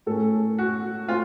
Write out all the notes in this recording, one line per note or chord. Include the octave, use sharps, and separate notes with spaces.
A2 A3 C#4 A4
F#4
A3 C4 F4